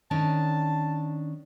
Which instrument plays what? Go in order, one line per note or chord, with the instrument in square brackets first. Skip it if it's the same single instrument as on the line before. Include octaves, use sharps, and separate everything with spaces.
[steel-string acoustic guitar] D#3 C#4 D4 [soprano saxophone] A5